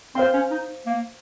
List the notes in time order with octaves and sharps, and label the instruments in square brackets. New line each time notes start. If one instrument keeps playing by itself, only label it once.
[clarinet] C4 [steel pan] C5 F5 C6
[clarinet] C#4
D#4
A#3